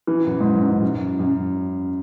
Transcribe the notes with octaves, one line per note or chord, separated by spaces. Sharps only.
E3
F#2
G#2
F#2
G#2
F#2
F#2